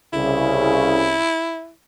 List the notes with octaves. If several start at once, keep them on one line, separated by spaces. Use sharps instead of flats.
C2 C#3 E4